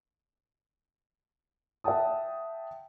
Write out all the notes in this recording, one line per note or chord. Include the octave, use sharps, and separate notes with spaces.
E5 F#5 G5 A5 D#6